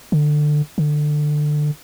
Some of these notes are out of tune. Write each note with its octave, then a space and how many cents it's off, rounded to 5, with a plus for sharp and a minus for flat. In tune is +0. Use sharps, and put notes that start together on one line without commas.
D3 +20
D3 +20